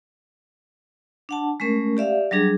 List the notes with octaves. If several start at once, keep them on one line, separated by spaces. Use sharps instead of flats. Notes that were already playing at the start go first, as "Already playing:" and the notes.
D4 F#5 A5
G#3 A3 C#4 A#4
G4 D5 E5 F5
F#3 G3 D4 G#4